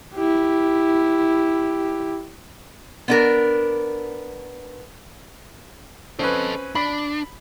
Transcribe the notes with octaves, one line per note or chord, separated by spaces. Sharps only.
E4 G4
B3 D4 A#4
C4 C#4 A4 B4 D#5
D4 B5